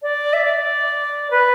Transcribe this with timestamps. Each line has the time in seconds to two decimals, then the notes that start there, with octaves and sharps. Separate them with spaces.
0.02 D5
0.33 E5
0.44 D5
1.30 B4